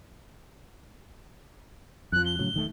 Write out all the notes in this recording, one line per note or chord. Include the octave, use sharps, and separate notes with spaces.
F2 F3 F#6
G7
A2 C#3 F#3
E1 D#3 A3